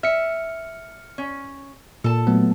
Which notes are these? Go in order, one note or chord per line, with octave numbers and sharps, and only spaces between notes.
E5 F6 C#7
C#4
A#2 A4 A5
F#3 A3 B3